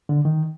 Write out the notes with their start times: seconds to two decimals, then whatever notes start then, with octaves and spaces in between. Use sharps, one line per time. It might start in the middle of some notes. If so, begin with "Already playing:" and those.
0.09 D3
0.25 D#3